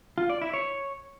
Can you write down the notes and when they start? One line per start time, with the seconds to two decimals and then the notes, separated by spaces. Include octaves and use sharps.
0.18 F4
0.30 D5
0.42 E4
0.53 C#5